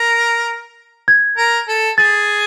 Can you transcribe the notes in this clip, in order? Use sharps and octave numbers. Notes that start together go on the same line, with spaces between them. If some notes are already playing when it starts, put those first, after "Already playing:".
Already playing: A#4
G#6
A#4
A4
G#4 A6